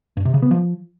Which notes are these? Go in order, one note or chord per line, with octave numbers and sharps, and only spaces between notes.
G2
C3
C#3
B3
F3